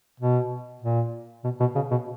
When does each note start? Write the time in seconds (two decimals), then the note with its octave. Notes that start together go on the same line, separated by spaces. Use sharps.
0.20 B2
0.82 A#2
1.44 B2
1.60 B2
1.75 C#3
1.91 B2